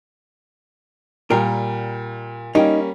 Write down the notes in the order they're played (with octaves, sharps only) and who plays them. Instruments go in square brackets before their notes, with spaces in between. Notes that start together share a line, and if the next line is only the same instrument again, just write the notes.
[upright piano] A#2 G3 G5 [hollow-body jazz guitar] A#4
[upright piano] G3 A#3 C#4 [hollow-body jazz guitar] D#4 G5